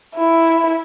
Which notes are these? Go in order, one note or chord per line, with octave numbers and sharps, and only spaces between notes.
E4